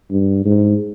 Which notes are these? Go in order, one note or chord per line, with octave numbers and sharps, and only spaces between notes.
G2
G#2